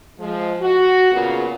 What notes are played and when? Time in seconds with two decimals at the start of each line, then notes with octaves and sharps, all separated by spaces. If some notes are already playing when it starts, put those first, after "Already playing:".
0.19 F3 G#3
0.61 F#4
1.12 A#2 C#3 B3 F4 G#4 A#4